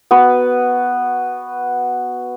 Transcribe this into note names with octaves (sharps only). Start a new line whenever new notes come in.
B3 F#4 B4